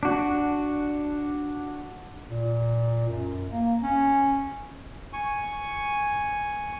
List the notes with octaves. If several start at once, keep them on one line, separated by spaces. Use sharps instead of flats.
D4 F#4
A#2
F#2
A#3
C#4
G#5 C#6